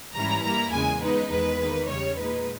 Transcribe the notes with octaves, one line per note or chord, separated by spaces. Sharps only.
G#2 E3 G3 C#4 E4 A#5
G2 G3 A#3 E4 A#5
E2 C#3 G#3 G#5
C#3 G#3 B3 D#4 B4
E2 D#3 G#3 B3 B4
D#3 A#3 D#4
E2 C#3 G3 C#5
A#2 G#3 D#4 B4